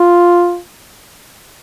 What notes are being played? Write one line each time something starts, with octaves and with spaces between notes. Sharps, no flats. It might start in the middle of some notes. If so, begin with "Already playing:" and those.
Already playing: F4